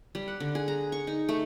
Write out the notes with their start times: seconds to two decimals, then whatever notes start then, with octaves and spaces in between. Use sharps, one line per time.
0.15 G3
0.28 F#5
0.40 D3
0.55 G#4
0.68 A#5
0.92 C#6
1.07 D#4
1.29 A3